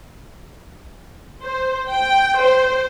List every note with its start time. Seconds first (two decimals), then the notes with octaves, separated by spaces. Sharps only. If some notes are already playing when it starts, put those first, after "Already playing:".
1.43 C5
1.90 G5
2.40 C5